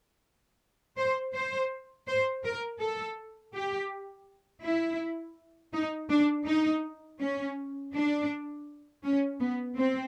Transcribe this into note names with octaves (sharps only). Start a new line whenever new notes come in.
C5
C5
C5
A#4
A4
G4
E4
D#4
D4
D#4
C#4
D4
C#4
B3
C4